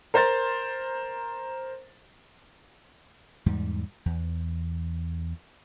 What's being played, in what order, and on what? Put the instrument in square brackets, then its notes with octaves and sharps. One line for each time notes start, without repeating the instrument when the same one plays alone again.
[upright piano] A#4 C5 A#5 A6
[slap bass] E2 G#2 G3
E2